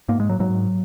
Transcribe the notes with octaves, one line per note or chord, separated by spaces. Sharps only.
G#2 A#3
G#3
F#3
G#2 F#3